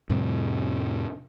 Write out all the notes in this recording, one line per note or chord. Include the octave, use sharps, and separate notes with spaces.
F2 A2 C3 G3